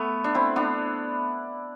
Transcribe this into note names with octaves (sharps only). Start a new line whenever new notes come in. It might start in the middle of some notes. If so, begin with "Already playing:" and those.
Already playing: A3 B3
D4
C4 E4
B3 D4